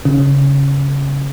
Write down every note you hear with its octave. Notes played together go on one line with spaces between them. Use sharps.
C#3